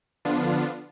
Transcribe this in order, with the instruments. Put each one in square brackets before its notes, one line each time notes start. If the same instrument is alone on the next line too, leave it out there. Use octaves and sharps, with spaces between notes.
[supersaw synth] D3 F3 B3 D4 F4